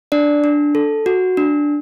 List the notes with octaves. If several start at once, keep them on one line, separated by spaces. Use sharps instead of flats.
D4 D5
D4
A4
F#4
D4